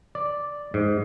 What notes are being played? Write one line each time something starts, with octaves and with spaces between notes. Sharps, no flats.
D5
G#2